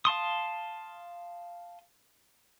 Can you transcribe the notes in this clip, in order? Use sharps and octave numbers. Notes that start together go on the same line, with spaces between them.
F5 A5 C6 D#6